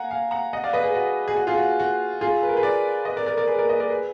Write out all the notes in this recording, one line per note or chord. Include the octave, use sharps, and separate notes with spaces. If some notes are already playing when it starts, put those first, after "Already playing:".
Already playing: F5 F#5 G#5 A#5
F5 G#5
F#5 A#5
D#5 F#5
D5 F5
B4 D#5
G#4 B4
F#4
G#4
F#4
F4 G#4
F#4
F#4
F4 G#4
B4
A#4
G#4 B4
A#4 D5
B4 D#5
A#4 D5
A#4 D5
A#4 D5
G#4 B4
A#4 D5
B4 D#5
A#4 D5
G#4 B4